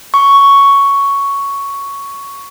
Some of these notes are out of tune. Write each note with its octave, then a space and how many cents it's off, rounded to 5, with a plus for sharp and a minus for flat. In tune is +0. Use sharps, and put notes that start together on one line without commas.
C#6 +5